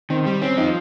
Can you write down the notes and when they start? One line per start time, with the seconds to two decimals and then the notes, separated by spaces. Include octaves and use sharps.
0.10 D#3 C4
0.26 G3
0.42 C4 C#4
0.57 F3 D#4